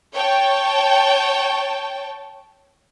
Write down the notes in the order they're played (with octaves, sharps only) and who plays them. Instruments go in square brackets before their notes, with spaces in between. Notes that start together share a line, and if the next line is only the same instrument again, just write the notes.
[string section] C#5 G5 A5